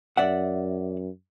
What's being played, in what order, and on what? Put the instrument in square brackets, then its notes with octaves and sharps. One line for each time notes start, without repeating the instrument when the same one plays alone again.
[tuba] F#2 [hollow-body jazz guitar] D5 E5 F#5